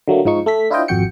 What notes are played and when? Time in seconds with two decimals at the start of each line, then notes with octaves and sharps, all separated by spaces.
0.08 D3 F#3 A3 A#3
0.25 G#2 F3 D#4 C#6
0.46 A3 A4 B6
0.70 D4 E4 F4 C5 D#5 G5
0.88 G#1 F2 F#4 G5 C#7